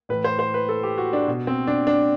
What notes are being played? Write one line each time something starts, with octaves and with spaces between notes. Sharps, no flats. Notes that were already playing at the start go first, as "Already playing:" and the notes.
A2 E3 B4
C5
C5
B4
A4
G4
F#4
D4
B2
C4
D4
D4